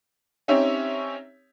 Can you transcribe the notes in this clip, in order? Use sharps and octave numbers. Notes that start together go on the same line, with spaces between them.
C4 C#4 D#4 G4 C#5 E5